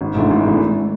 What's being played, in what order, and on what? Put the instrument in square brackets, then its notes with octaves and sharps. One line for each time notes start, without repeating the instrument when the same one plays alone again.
[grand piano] G#1
G#2 E3 A3 D4
G#1
E3 A3 D4